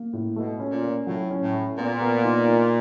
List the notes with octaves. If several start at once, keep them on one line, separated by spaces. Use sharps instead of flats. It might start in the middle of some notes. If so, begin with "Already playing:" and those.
Already playing: A#3
A2
B2 A3
C#4
A#2
C#4
A2 F#3
C#4
A2
A3
A#2 B3
B3
D#4
D#4